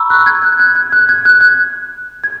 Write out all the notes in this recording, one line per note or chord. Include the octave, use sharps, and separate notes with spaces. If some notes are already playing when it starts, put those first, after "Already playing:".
Already playing: A#5 B5 C#6 E6
F#6
G#6
F#6
F#6
G#6
F#6
G#6
F#6
F#6
G#6